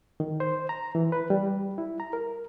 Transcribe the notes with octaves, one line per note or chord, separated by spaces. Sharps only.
D#3
C5
A#5
E3
B4
G3
E4
A#5
A#4